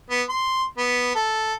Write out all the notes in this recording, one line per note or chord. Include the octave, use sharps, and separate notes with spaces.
B3
C6
B3
A4